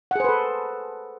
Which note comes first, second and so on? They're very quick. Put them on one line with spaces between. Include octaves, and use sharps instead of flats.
F#5 G#4 C5 B4 A4